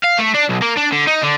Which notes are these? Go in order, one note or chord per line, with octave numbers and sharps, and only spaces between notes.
F5
A3
D4
B1
A#3
D4
D3
D#4
D3